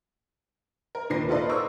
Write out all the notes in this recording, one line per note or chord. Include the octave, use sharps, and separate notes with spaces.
A#4
D#2 A#2 B4 A#6 C7
F4 A4 B4 D5 D#5
A#4 C5 C#6 D#6 E6